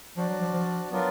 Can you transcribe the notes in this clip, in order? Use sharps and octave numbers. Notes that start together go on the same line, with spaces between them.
F3 D4 F#4 D5
F#3
F3
F3
F#3 B3 D4 F4 A#4 D5